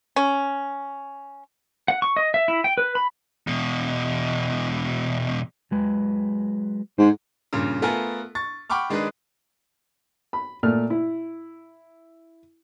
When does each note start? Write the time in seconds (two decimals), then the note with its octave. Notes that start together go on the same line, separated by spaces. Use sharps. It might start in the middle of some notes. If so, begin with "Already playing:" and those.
0.16 C#4
1.88 F#5
2.02 C#6
2.17 D#5
2.34 E5
2.48 E4
2.64 G5
2.78 B4
2.95 B5
3.47 E2 B2
5.71 F#3 G#3 B4
6.98 G#2 G#4 C5
7.53 G2 A#2 C#3
7.82 A3 B3 F4 A4 A#4 G#5
8.35 C#6 A6
8.70 F#5 G5 B5 C#6 D6 F6
8.90 D#3 G#3 D4 D#4 G#4 B4
10.33 B5
10.63 A#2 A3 F6
10.90 E4